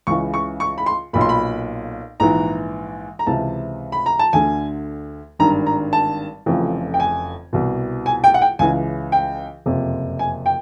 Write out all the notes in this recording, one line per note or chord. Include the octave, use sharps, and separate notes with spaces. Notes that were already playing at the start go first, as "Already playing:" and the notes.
C#2 C#3 E3 C#6
C#6
C#6
B5
C6
B1 A#2 B5
C6
B5
A#1 G#2 E3 A#5
A#5
C#2 C3 E3 A5
B5
A#5
A5
D2 D3 G#5
G#1 G2 D#3 A#5
A#5
A5
F1 F2 C#3 E3
G5
G#5
C2 B2
G#5
G5
F#5
G5
C#2 C#3 E3 G#5
G5
F#1 F2 C3
G#5
G5